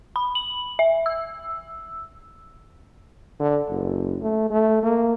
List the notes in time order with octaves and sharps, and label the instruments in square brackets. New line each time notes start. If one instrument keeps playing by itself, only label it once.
[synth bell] B5
F#7
E5
E6
[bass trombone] D3
F#1
A3
A3
A#3